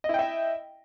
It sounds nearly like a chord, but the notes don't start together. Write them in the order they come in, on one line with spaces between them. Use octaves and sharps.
D#5 E4 G5 E5